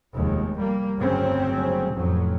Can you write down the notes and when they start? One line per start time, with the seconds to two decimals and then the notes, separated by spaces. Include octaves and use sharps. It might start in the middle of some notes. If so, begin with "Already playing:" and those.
0.14 F1 D#2 G#3
0.57 G3 A#3
0.98 G1 D2 C#3 F#3 C4 C#4
1.93 F1 F2 A2 F#3